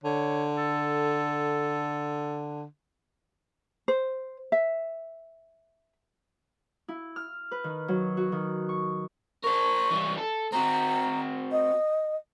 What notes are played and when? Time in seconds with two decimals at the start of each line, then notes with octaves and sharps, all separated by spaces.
0.04 D3 C#5
0.57 A4
3.88 C5
4.52 E5
6.88 E4
7.16 F6
7.51 B4
7.64 D#3
7.88 F#3
8.17 F#4
8.32 D#3
8.69 C#6
9.44 A#4 C5 C#6
9.91 E3 G3
10.17 A4
10.52 C4 F#4 A#5
11.51 D#5